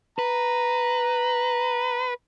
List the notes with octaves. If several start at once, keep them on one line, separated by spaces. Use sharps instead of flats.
B4 A#5